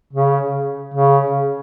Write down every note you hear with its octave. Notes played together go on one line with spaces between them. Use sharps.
C#3
C#3